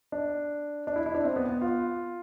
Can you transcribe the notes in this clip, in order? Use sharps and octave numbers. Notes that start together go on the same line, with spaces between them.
D4
D4
E4
E4
D4
C4
B3
B3
F4